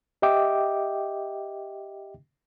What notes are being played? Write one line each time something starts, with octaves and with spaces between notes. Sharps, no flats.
G4 D#5 E5 G5 D6